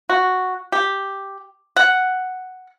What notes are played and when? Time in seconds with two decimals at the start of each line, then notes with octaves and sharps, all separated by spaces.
0.09 F#4
0.72 G4
1.76 F#5